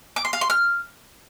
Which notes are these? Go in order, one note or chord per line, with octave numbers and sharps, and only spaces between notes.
D6
C6
F5
C6
F6